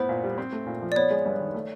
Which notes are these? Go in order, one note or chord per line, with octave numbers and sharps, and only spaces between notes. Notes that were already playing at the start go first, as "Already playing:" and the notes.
Already playing: A2 B3 E4 C5
A#2
G3
C4
A3
A#2
F3
D5
B3 C#5
G#3
G2
D#3
A3